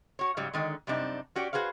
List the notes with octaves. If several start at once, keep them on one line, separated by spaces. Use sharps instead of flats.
F#4 C#5
G#2 C#3 F#3 G3
D3 D#3 G#3
F#2 C3 G3 C4 D4 D#4
C#4 F#4 G4 D5
F#4 G#4 B4 C5 F5